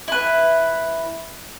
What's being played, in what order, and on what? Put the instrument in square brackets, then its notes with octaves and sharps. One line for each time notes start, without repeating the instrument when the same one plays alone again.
[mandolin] E4 B4